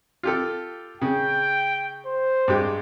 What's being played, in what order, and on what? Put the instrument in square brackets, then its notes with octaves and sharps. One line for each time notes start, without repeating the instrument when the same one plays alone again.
[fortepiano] F4 G4 A4
[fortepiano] C#3 [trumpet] G5
[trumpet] C5
[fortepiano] G2 G#3 G4